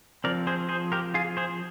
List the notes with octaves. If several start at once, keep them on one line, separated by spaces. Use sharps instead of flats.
F3 C4 A#4 D5
G#4 C5
G#4 C5
G4 A#4
F4 G#4
G#4 C5